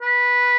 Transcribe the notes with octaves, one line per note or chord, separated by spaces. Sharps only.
B4